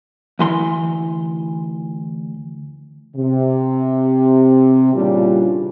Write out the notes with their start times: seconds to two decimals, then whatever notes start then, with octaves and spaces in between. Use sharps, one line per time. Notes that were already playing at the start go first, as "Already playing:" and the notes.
0.39 D2 E3 C6
3.16 C3
4.94 A#2 C#3 E3 G3 D4 F4